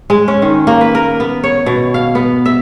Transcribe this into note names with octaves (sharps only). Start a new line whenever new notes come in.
G#3
C#4
D#3
A#3
B4
A#4
B3
C#5
B2
F5
B3
E5